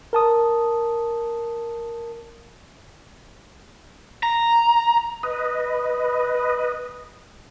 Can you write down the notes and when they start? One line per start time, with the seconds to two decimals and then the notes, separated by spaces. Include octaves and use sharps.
0.13 A#4 A5 D#6
4.23 A#5
5.23 B4 D#5